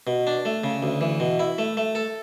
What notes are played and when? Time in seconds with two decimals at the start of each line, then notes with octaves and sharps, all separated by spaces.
0.07 B2
0.27 D4
0.45 A3
0.64 C#3
0.83 D2
1.01 E3
1.20 B2
1.39 E4
1.58 A3
1.77 A3
1.95 A4